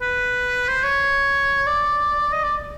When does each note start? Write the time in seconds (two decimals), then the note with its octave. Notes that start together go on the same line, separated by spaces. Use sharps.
0.01 B4
0.68 C5
0.84 C#5
1.67 D5
2.33 D#5
2.44 D5